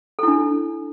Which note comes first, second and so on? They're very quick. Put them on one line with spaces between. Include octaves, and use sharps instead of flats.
A4 E4 D4